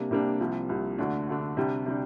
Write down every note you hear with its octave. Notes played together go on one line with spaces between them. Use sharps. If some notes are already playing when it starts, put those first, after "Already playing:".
Already playing: C3 G3 A#3 D4
C3 G3 A#3 D4
C2 C3 F3
C2 C3 F3
D2 D3 A3 D4
D2 D3 A3 D4
C3 G3 D4
C3 G3 D4